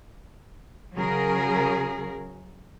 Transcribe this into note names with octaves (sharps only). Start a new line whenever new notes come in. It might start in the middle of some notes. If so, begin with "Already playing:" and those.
C#3 F#3 G#4 A#4